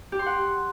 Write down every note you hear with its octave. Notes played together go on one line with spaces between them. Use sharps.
G4
C6
F#5